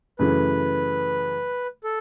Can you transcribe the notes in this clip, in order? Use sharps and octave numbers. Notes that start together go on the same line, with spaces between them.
F#2 C#3 E3 A3 B4
A4